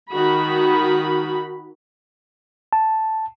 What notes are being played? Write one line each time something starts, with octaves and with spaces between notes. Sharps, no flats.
D#3 F#4 B5
A5